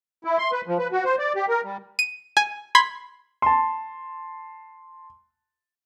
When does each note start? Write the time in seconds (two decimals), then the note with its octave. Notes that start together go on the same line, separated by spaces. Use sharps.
0.24 E4
0.38 C6
0.52 B4
0.67 F3
0.79 B4
0.92 F#4
1.05 C5
1.19 D5
1.35 G4
1.49 A#4
1.64 G3
1.99 D#7
2.37 G#5
2.75 B5 C6 G#6 B6
3.42 A5 C6